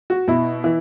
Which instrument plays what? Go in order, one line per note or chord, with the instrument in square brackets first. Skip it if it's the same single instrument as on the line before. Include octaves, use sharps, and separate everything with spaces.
[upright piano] F#4
B2 E4
E3